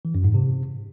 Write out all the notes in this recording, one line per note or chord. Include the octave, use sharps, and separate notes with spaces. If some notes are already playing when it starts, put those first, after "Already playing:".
E3
F#2
G#2
C3